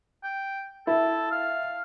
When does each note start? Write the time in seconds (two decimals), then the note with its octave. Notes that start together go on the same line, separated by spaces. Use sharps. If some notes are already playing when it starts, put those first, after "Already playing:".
0.23 G5
0.87 E4 A4
1.31 F5